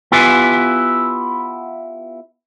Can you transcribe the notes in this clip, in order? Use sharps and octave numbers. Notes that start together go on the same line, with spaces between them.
B3 E4 F4 G4 B4 G#5